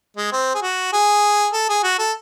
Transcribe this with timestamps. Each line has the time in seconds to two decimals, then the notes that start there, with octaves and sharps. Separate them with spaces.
0.17 G#3
0.32 C4
0.55 G#4
0.62 F#4
0.93 G#4
1.53 A4
1.69 G#4
1.84 F#4
1.99 A4